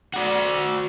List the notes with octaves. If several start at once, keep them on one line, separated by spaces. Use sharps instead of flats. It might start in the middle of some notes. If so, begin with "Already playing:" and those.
F#4 D5